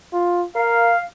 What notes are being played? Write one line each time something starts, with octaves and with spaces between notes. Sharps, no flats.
F4
A#4 F5